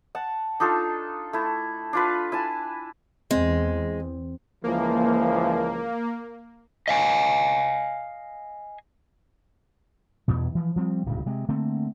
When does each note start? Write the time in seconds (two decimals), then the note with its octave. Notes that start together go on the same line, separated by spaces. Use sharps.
0.15 F#5 A5
0.60 D4 D#4 F4 A4
1.33 A3 E4
1.93 D4 F4 B4
2.32 E4 G#5 A5
3.31 E2 G#3 C4
4.64 C#2 E3 F3 A#3
6.88 D#5 F5 G#5
10.28 E2 G2 B2
10.55 E3 F3
10.76 F3 G3 C4
11.06 D1 C#2 G2 A#2
11.26 C3 G#3
11.49 D3 A3 A#3 C4